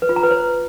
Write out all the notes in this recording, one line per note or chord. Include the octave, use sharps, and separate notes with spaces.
B4
F4
A#5
B4
C5